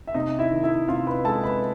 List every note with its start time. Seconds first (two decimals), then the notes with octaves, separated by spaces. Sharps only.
0.07 E5
0.14 C3 D#4 D#5
0.39 E4 E5
0.51 D#3
0.63 E4 E5
0.88 C3 F4 F5
1.07 B4 B5
1.25 G#3 A4 A5
1.43 B4 B5